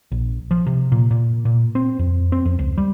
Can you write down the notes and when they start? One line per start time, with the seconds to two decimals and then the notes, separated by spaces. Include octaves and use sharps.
0.12 A#1
0.51 F3
0.66 C3
0.92 A#2
1.11 A#2
1.45 A#2
1.75 C4
1.99 F2
2.32 C4
2.45 F2
2.59 C#2
2.78 G3